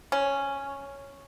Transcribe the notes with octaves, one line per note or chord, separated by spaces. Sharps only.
C#4